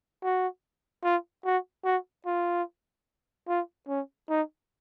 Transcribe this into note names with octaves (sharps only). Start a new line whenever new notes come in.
F#4
F4
F#4
F#4
F4
F4
C#4
D#4